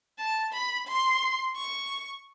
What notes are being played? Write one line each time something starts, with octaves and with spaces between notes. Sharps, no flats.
A5
B5
C6
C#6